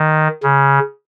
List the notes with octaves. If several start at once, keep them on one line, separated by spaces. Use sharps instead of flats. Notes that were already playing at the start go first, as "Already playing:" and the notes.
Already playing: D#3
C#3